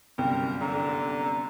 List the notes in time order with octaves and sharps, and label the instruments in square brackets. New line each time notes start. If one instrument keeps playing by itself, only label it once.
[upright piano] G1 C2 F#2 [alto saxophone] A#4 [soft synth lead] G5
[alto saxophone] D3 [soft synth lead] A#5